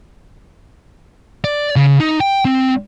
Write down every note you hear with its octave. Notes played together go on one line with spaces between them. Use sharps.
D5
C#3
D#4
G5
C4